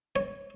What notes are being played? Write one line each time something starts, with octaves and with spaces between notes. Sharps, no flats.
C#5